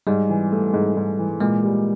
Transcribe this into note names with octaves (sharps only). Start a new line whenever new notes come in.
G#2 G3
E3
A3
G#2
G#2
E3
A#2 G#3
G3